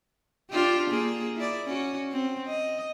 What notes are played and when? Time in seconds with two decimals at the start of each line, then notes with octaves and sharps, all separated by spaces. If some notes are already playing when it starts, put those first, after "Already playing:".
0.51 D4 F4 G4
0.90 A#3 G#4
1.36 E4 D5
1.66 C#4 F#4
2.12 C4
2.47 D#5